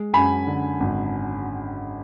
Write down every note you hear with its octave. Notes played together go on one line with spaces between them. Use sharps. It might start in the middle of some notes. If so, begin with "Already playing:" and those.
Already playing: G#3
F#2 G#5 B5
D3
G#1